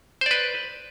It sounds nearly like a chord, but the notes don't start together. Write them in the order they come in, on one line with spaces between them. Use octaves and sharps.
C5 D5 B4